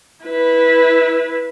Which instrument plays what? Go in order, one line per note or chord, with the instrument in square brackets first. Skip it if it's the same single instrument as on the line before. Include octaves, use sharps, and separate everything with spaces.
[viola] E4 B4